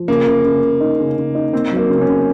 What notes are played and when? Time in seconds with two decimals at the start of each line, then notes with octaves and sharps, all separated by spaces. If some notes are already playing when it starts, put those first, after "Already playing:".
Already playing: F3
0.08 C#3 A#3
0.26 C#3
0.44 C#3
0.62 C#3
0.80 D#4
0.99 C#3
1.17 C#3
1.35 D#4
1.53 A#3 C4
1.72 F#3
1.77 A#3
1.89 C#3
2.01 C#4
2.07 C#3